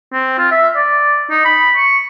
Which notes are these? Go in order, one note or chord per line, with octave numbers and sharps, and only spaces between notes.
C4
F4
E5
D5
D#4
B5
C#6